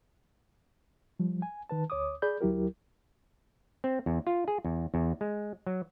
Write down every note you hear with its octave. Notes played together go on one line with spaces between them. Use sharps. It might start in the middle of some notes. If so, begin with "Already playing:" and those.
F3 G3
G#5
D#3 B4 A5
D2 C#5 D6 D#6
G#4 D5 B5 G6
D2 F#3 E4 G4 A#4
C4
E2
F4
G#4
E2
E2
G#3
F#3